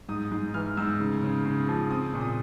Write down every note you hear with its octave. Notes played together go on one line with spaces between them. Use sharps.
G#2 D#6
G#2
E3 F6
G#2 E6
C#3
C#3
C#3
F3
C4 D#6
A#2
D#6